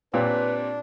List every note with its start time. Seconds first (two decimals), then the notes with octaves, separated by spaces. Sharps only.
0.14 A#2 C4 D4 G4 B4 C#5